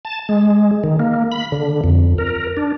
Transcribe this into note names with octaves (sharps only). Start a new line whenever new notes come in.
A5
G#3
D#3
A#3
B5
D3
F2
A#4
D4